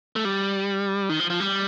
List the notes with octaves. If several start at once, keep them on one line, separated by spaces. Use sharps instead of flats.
A3
G3
D#3
F3
F3
G3